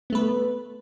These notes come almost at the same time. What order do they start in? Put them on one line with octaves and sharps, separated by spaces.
B3 A3 B4